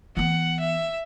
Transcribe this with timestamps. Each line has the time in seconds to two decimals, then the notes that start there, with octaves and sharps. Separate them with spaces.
0.17 E3 B3 F#5
0.60 E5